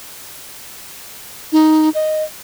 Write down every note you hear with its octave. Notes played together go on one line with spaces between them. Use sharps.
D#4
D#5